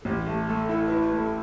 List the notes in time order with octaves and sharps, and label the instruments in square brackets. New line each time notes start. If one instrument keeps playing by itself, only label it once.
[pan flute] A4
[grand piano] A1 [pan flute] G4
[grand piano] A3 [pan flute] G4
[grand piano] A3 [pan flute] A4
[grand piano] E4 [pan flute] A4
[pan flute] B4
[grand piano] E4
[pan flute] B4
[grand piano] A3
[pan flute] A4